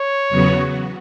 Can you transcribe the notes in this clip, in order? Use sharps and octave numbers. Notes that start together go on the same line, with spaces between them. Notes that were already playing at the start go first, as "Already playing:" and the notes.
Already playing: C#5
E2 C#3 F#3 B3 F#4